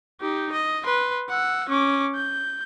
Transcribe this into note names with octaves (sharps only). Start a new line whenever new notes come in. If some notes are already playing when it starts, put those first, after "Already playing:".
D#4 G4
D#5
B4 C6
F#5 E6
C#4 D6
G6